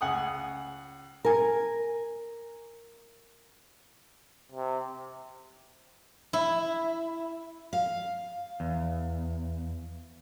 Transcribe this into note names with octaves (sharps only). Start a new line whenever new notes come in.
C#2 F#5 G#5 D#6
A#4 G#5
C3
E4
F5
E2